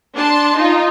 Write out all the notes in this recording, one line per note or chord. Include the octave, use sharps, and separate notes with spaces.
D4 A5 C6
D#4 F4